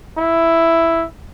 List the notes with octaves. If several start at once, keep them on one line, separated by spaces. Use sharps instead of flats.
E4